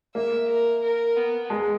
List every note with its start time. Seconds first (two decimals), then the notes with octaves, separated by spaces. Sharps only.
0.15 A#3 E5
0.48 A#4
0.82 A#4
1.16 B3
1.50 G#3